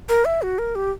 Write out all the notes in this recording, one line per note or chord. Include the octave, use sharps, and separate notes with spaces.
A#4
E5
F#4
A#4
G4